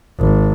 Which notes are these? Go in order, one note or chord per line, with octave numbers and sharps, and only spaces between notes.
G#1